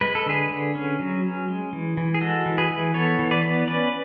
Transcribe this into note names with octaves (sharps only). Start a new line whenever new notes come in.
G#3 B4
A4
D3 G#4 B4
D3
C#4
F#3
C#4
G#3
E3
E3
G#4
G#3 F#4 A4
E3
G#4 B4
E3
B3 A4 C#5
E3
B4 D5
B3
C#4 B4 D5